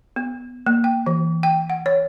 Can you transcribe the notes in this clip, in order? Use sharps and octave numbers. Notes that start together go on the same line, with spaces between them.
B3
A#3
G5
E3
G5
F#5
C#5